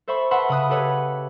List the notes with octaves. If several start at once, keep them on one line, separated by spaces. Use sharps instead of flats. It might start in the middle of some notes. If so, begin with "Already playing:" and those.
A4 C5 E5 B5 C#6
B4 E5 F#5 A5 B5 C6
C#3 B5 D#6 F#6
G4 A4 B4 C#5